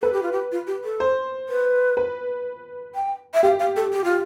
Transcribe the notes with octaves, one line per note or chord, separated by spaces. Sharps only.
A4 B4
G4
F4
G4
F4
G4
A4
C5
B4
B4
G5
E5
G4 F5
F5
A4
G4
F4